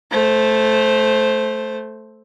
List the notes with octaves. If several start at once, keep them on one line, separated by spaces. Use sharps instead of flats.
A3 C5